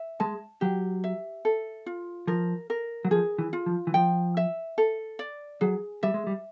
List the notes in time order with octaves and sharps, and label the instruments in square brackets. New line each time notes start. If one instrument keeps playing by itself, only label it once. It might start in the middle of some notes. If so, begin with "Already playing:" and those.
Already playing: [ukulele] E5
[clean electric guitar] G#3 [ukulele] A5
[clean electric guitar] F#3 [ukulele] G4
[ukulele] E5
A4
F4
[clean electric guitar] F3 [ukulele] A#4
[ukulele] A#4
[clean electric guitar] F#3
[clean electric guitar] F3 [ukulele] G#4
[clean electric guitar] E3
[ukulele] F4
[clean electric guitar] F3
E3
[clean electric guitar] F3 [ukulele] G5
[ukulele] E5
A4
D5
[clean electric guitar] F#3 [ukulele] G#4
[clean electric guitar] G3 [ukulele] E5
[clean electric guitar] G#3
G3